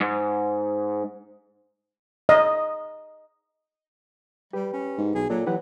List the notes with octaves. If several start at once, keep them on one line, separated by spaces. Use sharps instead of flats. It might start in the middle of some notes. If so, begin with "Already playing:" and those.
G#2
D#5
G3 G4 B4
C#4
G#2
B1 G#4
A#2 F#3 A4 D5
E3 F#3 G4 B4 F#5